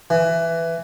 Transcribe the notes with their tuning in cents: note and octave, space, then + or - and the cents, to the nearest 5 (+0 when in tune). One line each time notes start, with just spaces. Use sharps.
E3 +10